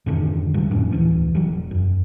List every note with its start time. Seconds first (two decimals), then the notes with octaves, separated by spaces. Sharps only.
0.06 F2 G#2 D3 D#3
0.54 D#2 G#2 F#3 G3
0.71 F2 A2 C#4 D4
0.92 D1 E3
1.35 E1 F#3
1.71 F#2